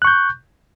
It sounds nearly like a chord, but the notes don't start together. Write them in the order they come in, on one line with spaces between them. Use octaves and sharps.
F#6 C#6 G6